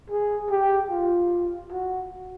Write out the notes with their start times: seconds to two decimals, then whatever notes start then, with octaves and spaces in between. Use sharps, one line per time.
0.10 G#4
0.50 G4
0.91 F4
1.72 F#4